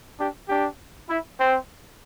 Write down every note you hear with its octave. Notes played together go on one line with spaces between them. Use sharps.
D4 G4
D4 G4
E4
C4